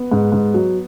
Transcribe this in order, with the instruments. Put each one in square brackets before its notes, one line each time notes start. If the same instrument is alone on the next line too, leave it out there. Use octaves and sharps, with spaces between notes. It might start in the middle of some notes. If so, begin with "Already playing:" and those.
Already playing: [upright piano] B3
[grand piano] G#2
G#2
F#3